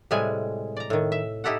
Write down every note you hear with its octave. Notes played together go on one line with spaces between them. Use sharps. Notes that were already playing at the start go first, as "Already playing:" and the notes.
A2 C3 G3 G#3 G#5
D5 A#5
A2 D#3
E5
D#4 E4 G4 A4 F#5